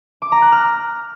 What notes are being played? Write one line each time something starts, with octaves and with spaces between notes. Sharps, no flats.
D6
A#5
F#6
F6